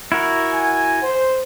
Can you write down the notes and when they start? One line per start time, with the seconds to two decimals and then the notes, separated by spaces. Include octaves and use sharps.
0.12 E4 F#4 A#4
0.53 G#5
1.02 C5